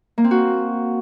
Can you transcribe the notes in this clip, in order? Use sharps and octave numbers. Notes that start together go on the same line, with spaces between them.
A#3
C4
F#4